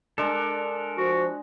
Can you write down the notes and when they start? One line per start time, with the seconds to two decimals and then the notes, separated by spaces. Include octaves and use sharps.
0.18 G#3 D4 A4 A#4
0.97 F3 F#4